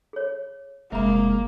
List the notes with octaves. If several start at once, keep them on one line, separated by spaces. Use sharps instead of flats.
G#4 C#5
F#1 C2 G#3 A#3 A#4 E5 A#5